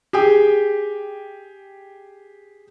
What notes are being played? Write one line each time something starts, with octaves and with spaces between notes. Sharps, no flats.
G4 G#4 G5